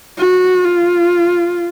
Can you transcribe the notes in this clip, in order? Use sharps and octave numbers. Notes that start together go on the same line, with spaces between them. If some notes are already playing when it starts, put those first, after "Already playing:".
F#4
F4